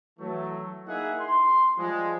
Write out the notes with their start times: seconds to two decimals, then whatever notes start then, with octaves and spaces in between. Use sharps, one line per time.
0.19 E3 F#3 A3
0.87 A#3 D#4 E4 G#4 E5 F#5
1.20 C6
1.78 F3 G3 G#3